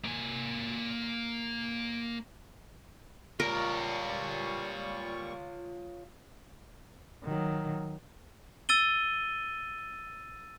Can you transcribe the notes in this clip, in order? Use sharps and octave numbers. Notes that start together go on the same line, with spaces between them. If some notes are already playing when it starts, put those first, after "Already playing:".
A#3 G#5
A#2 G3 F4 A#4 C#5 C#6
D#3 F#3
E6 A6 D#7 G7